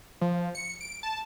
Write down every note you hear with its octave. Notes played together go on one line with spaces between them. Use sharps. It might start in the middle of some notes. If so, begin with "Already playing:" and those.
F3
C#7
D7
A5